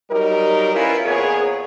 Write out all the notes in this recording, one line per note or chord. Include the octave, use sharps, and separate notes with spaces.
F#3 G3 D#4 G4 A#4
C#4 E4 F4 A#4 B4
F2 A#2 B3 G#4 A#4 C#5